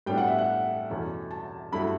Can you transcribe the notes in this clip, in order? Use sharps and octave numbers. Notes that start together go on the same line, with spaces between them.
A2 G3 B3 D4 G5
F#5
E5
F#5
E2 B2 A3 C#4
A5
G2 F#3 A3 E4 B5